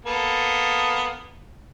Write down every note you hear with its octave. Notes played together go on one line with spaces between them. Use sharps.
A#3 B3 A4